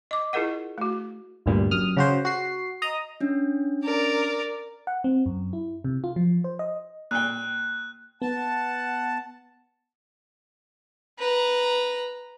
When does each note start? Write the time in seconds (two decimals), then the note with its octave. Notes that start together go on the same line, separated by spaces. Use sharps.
0.11 D#5 D6
0.33 E4 F4 G#4 A#4 D#5 F#5
0.78 A3 F#4
1.46 G1 D2 G2 A#2 G3
1.71 F#2 D#6 F6
1.97 C#3 F#4 C5
2.25 F#4 C7
2.82 D#5 A#5 D#6
3.21 C#4 D4
3.84 A#4 D5
4.87 F#5
5.04 C4
5.26 F#2
5.53 E4
5.84 C3
6.04 F4
6.16 F3
6.44 C5
6.59 D#5
7.11 A#2 G5 F#6
8.22 B3 F#5 A5
11.19 B4 A#5